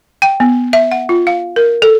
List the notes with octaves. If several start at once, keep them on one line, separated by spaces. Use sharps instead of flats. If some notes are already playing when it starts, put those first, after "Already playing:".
G5
B3
E5
F#5
F4
F5
A#4
A4